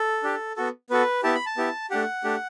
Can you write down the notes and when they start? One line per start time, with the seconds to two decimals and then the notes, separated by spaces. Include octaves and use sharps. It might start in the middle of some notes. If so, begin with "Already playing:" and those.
Already playing: A4
0.23 D4 G4
0.56 B3 F#4 A4
0.90 B3 F#4 A4 B4
1.23 B3 E4 G4 A5
1.35 B5
1.46 A5
1.57 B3 E4 G4
1.90 A3 D4 G4 F#5
2.24 A3 D4 G4